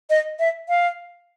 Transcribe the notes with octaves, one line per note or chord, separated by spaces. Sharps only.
D#5
E5
F5